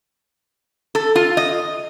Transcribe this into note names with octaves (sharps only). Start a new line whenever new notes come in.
A4
F4
D#5